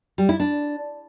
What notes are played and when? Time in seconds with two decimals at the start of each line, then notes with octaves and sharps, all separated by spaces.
0.18 G3
0.29 E4
0.40 D4